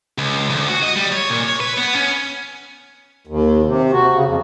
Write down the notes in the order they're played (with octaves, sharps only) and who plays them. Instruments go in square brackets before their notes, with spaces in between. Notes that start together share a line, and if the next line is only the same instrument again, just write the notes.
[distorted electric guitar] C#2
D2
F#4
D#5
G3
C#5
A#2
C#5
B4
B3
C#4
[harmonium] D#2
C3
F#4
C#3
F2